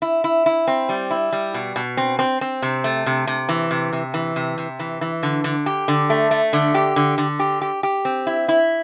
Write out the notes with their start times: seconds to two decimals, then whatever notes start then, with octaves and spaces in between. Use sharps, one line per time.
0.02 E4
0.24 E4
0.46 E4
0.67 C4
0.89 G3
1.10 E4
1.32 G3
1.54 B2
1.76 B2
1.97 C4
2.19 C4
2.41 C4
2.62 C3
2.84 A3
3.06 C3
3.27 C3
3.49 E3
3.71 C3
3.93 C3
4.14 E3
4.36 C3
4.58 C3
4.79 E3
5.01 E3
5.23 D3
5.44 D3
5.66 G4
5.88 D3
6.10 A3
6.31 A3
6.53 D3
6.74 G4
6.96 D3
7.18 D3
7.39 G4
7.61 G4
7.83 G4
8.05 C4
8.26 E4
8.48 E4